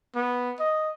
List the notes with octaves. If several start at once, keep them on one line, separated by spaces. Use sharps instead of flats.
B3
D#5